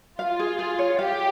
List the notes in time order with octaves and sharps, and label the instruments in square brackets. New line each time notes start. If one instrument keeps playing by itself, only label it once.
[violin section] F4 [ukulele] F5
[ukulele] G#4
G#4
C#5
[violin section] G4 [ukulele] F5